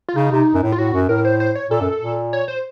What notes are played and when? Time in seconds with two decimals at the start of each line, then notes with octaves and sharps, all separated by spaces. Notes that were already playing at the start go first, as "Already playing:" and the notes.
0.09 F4
0.16 C#3 D#4
0.31 C3
0.54 F#2
0.63 A2
0.72 F4
0.78 A2 F#4
0.93 F#2
1.09 A2 A#4
1.25 C5
1.40 C5
1.55 C#5
1.71 A#2 A4
1.81 F#2
2.01 A#2
2.33 C#5
2.48 C5